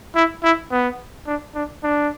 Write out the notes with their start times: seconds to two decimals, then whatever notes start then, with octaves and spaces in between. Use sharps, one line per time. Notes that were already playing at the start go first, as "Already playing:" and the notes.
0.15 E4
0.43 E4
0.71 B3
1.27 D4
1.55 D4
1.83 D4